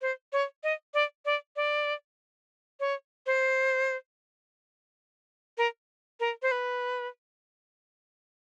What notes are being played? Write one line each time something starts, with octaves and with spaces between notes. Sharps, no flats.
C5
C#5
D#5
D5
D5
D5
C#5
C5
A#4
A#4
C5
B4